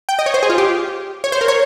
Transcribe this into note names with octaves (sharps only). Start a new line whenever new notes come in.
G5
D#5
C#5
C5
G#4
F4
G4
C#5
C5
A#4
C#5